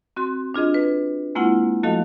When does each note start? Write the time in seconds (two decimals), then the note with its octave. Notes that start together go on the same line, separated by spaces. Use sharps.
0.16 C4 F#4 C6
0.54 D4 F4 G#4 D#5
0.74 B4
1.35 G#3 A#3 C4 E4 F4 F#5
1.83 F3 A3 F#4 A4 D#5 F5